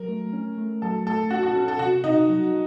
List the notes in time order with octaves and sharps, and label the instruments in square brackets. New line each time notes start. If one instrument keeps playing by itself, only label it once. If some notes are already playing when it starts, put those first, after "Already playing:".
Already playing: [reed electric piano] F#3 [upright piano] A#4
[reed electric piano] A3
C#4
A3
[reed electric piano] F#3 [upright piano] A4
[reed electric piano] A3 [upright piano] A4
[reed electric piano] C#4 [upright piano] F#4
[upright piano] F#4
[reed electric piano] C#4 [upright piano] A4
[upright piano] A4
[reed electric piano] C3 [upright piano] F#4
[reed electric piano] C3 [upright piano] D#4
[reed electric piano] F#3